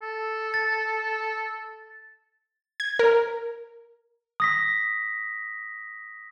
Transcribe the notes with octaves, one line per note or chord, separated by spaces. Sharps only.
A4
A6
G#6
A#4
D#6 A#6 B6